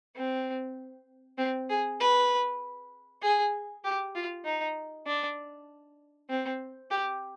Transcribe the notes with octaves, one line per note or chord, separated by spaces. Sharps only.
C4
C4
G#4
B4
G#4
G4
F4
D#4
D4
C4
G4